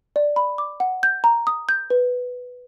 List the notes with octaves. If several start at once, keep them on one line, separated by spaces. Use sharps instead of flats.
D5
B5
D6
F#5
G6
A#5
D#6
G6
B4